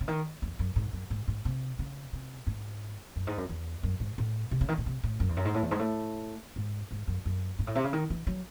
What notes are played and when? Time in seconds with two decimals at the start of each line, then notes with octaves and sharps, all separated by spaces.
0.01 C#3
0.08 D#3
0.42 E2
0.59 F#2
0.76 G#2
0.93 F#2
1.10 G#2
1.28 G#2
1.45 C3
1.79 C#3
2.13 C3
2.47 G#2
3.16 F#2
3.27 G#2
3.38 F#2
3.49 E2
3.83 F#2
4.00 G#2
4.18 A2
4.51 C3
4.61 C#3
4.69 D#3
4.78 A2
4.86 C3
5.03 A2
5.20 F#2
5.29 E2
5.37 F#2
5.45 G#2
5.54 A2
5.63 E2
5.71 G#2
5.79 A2
6.56 G#2
6.91 G#2
7.08 F#2
7.25 F#2
7.59 G#2
7.67 A2
7.75 C3
7.84 C#3
7.93 D#3
8.10 E3
8.27 F#3